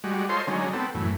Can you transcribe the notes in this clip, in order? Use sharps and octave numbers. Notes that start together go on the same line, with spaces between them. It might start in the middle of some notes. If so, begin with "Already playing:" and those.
G3 G#3 F#4
F4 A4 C5 C#5 D#5 C6
D3 F#3 G#3 C#4 D#4
B3 C4 A4
F#2 A2 E3